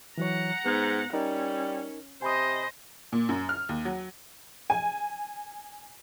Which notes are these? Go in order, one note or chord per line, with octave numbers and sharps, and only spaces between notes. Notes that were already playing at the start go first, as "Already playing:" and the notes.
E3 F#3 C#5 F#5 A#5
G#2 B3
G3 C#4 D#4 A#4
C3 C5 D#5 G#5 B5 D#6
A#2
F#2
F6
D#2
F#3
G#5